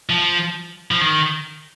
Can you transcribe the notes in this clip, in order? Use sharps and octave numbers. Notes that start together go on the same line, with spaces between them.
F3
F3
D#3